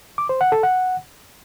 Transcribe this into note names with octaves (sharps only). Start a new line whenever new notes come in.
D6
C5
F#5
A4
F#5